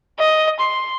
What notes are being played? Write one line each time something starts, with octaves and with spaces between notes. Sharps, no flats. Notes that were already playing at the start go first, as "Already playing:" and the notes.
D#5
C6